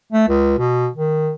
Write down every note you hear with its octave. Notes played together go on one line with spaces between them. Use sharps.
A3
C#2
B2
D#3